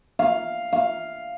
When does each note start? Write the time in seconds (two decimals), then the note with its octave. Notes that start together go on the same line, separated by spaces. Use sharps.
0.19 F5
0.73 F5